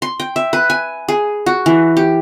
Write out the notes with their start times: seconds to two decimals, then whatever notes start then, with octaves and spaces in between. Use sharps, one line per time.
0.02 C6
0.20 G5
0.36 E5
0.53 B4
0.70 G#5
1.08 G#4
1.46 F#4
1.66 E3
1.97 G4